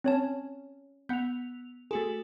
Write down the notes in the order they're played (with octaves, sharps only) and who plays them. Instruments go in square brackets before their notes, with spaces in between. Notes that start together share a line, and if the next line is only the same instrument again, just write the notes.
[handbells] C4 C#5 A5 [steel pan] C#4
[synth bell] B3 F7 [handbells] F#5 B5 G6
[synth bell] A3 F#4 A4 [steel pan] G#4